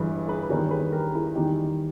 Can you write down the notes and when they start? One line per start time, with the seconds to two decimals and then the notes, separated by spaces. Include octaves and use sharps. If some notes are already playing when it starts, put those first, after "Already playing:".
Already playing: G1 G2 E3 G#3 G#4 B4
0.28 G#4 B4
0.43 B4
0.49 E2 D#3 G3 A#4 C#5
0.71 G#4 B4
0.92 G4 A#4
1.14 E4 G#4
1.35 E2 D#3 G3 D#4 G4